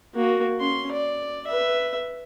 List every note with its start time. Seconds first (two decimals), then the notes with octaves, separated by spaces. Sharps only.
0.14 A#3 F#4
0.60 C#4 C6
0.92 D5
1.47 B4 E5